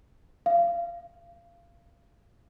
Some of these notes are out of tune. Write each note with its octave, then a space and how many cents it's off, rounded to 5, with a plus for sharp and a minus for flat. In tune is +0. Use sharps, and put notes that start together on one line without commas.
F5 -25